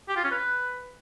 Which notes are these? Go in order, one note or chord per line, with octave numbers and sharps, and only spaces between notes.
G4
F4
C#4
B4